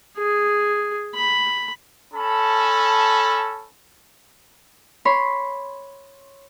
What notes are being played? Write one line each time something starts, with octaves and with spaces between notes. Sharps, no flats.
G#4
B5
C#4 A4 A5 B5
C#5 B5 C6